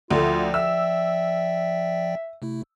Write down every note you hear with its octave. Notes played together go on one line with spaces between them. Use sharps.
D2 F3 A3 F4 D5 G5
E5 E6
C3 A3 E4